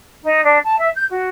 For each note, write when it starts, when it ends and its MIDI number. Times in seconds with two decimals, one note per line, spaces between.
0.22 0.43 63
0.43 0.57 62
0.63 0.77 81
0.78 0.89 76
0.95 1.05 91
1.09 1.29 66